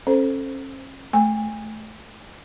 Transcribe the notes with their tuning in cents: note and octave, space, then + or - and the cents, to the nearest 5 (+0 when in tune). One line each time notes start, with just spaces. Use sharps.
C#4 -40 A4 +0 C5 +0
A3 -20 G#5 -30